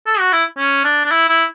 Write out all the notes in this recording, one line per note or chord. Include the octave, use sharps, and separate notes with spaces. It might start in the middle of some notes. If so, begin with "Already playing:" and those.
A4
F#4
E4
C#4
D4
D4
E4
E4